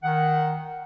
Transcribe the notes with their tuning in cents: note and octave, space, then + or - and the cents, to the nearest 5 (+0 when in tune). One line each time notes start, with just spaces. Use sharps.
D#3 +0 F#5 +0